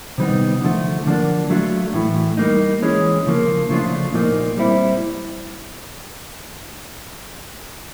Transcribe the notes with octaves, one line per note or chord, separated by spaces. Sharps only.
C3 D#3 G3 B3 D#4
D3 F3 A3
D3 F3 A#3 D4
F#3 A3 D4 F4
A2 E3 A3
G3 A#3 D#4
E3 G#3 C#4
C#3 F3 A#3
C#3 F3 A3 D4 F4
A#2 F3 A#3 D#4
G3 C4 E4